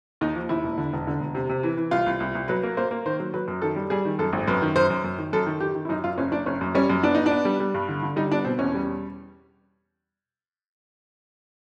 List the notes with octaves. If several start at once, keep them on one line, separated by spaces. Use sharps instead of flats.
D#2 D#4
F3
D#2 E4
E1
D3
E1
D3
E1
C3
C3
E3
E3
C2 F4
C2
C2
C2
F#3 B4
A#3
A#3 C5
A#3
D#3 C5
F#3
F#3 B4
F#2
D#3 A4
G3
G3 G#4
D#3
F#2 A4
G#1
F#2 B4
D#3
F#2 C5
F#2
F#2
D#3
F#2 A4
D#3
D#3 G4
D#3
E4
F#2 D#4
F#2 F4
F#1 C#4
F#1 D4
F#1 C#4
F#2
G3 C#4
F#2
B3 D4
B3 D#4
D4
B3
G3
G3
G2
D3
D3
G3 D#4
B3 D4
B2 C4
E2 C#4
G3